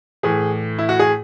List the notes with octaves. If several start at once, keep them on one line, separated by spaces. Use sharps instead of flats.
A2 E3 G#4
E4
F#4
G#4